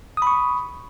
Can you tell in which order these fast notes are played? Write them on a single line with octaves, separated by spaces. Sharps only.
D#6 B5 C#6